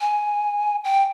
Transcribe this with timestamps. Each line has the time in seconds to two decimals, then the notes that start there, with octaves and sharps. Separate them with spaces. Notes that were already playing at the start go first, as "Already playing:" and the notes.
0.01 G#5
0.84 G5